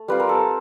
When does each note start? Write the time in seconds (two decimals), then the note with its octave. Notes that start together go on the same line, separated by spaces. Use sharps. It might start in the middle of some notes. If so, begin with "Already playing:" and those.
Already playing: A3
0.08 G3 C4 F4 B4
0.20 A#4
0.29 A4